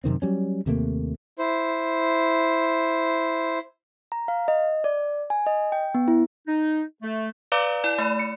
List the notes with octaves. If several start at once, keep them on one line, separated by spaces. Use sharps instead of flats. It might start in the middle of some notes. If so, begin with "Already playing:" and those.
F#2 C3 D#3 C4
F#3 G3 C#4
D#2 C3 A3 A#3
E4 C5
A#5
F5
D#5
D5
G#5
D#5
G5
B3
E4
D#4
A3
B4 D5 F5 A#5 D6
E4 D5
A3 D5 B5
C#7